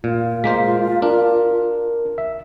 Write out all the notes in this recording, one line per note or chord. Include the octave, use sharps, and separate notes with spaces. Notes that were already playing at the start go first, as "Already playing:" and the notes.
A#2 F4
G#3 A#3 C5 B6
D4 A#4
E5